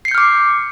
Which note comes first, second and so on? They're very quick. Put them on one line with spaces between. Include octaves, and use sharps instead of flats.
C7 C#7 G6 F6 D6